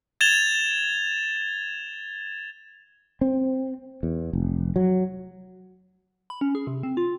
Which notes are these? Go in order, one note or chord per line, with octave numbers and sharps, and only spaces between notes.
G#6 A6 E7 F7 G7
C4
E2
F1
F#3
B5
C#4
G#4
C3
C4
F4